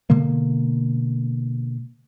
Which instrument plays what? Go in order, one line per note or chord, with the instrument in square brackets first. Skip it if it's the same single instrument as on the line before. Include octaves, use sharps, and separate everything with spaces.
[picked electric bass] B2 D3 G#3 A#3